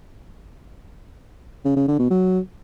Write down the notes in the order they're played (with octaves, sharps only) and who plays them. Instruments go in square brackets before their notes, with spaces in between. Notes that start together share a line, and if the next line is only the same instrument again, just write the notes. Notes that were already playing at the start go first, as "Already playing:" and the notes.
[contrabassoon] C#3
C#3
D3
B2
F#3